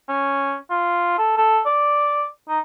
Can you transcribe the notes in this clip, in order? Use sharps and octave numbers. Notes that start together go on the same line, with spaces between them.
C#4
F4
A4
A4
D5
D#4